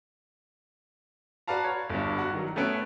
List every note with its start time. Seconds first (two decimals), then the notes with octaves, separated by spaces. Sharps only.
1.48 F#4 B4 D5 F5 A5 A#5
1.64 C#5
1.90 G1 G2
2.18 F#4 F#5
2.33 D#3 F#3
2.56 A3 B3 C#4 F#6 D7